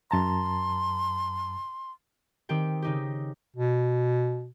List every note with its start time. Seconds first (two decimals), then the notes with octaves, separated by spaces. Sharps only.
0.11 F#2 A5 A#5 C6
2.49 D#3 C4 G4 G5
2.82 C#3 D#4 G4
3.56 B2